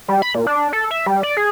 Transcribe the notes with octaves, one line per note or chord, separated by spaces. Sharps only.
G3
B5
A#2
D4
A4
E5
G3
D5
G#4